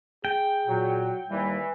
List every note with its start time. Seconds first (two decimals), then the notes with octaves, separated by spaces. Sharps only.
0.25 G#4 G5
0.67 A#2 F#3
1.30 D#2 E3 G3